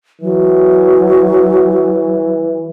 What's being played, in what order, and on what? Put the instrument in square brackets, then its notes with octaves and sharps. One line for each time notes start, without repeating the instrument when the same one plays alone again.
[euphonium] E3 [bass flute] F#3